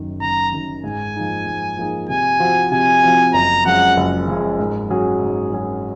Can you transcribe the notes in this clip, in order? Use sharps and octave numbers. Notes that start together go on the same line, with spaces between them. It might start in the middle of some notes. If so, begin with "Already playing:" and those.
Already playing: F#1 F#2 D#3
F#1 A#5
F#2 D#3
G#2 G#5
F3 A#3 D#4 G#4
G#2
F3 A#3 D#4 G#4
C3 G#5
F3 C4 F#4
C3 G#5
F3 C4 F#4
F#1 A#5
F#2 F3 G#3 F#5
F#1
F#2 F3 G#3
G#2
F#3 C#4 G#4
G#2
F#3 C#4 G#4